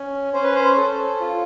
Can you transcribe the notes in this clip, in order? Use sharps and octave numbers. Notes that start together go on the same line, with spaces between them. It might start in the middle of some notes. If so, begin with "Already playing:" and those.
Already playing: C#4
C#4 C5
B4
C5
A4
F4